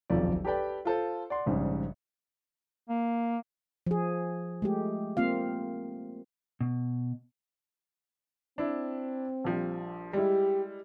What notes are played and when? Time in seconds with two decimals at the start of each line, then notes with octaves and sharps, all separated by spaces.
0.10 D#1 B1 F2 F3 D5
0.45 G4 A4 B4 D5 G5
0.85 F4 A4 C5
1.30 D5 F#5 C6
1.46 A#1 G#2 C#3 G3
2.89 A#3
3.87 F3 G#4
4.62 G#3 A3 G4
5.17 A#3 C4 F4 F5
6.61 B2
8.58 C4 D4 E4
9.44 A#1 F3 G3
10.13 G3 G#3 E4 G4